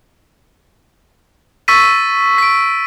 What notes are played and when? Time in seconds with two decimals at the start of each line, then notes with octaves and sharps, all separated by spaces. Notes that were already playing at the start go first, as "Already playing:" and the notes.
1.68 C#6 E6 A6 B6 D#7
2.38 B6 D7